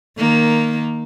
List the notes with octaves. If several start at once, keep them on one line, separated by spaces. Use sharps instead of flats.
D#3 A#3